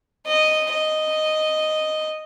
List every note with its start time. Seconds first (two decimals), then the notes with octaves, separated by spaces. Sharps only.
0.27 D#5
0.73 D#5